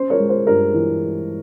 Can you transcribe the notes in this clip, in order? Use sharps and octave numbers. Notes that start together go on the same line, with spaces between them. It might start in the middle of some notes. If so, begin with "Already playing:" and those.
Already playing: C#4 C5
A#4 C#5
G#3
C5
G2 A#4
E3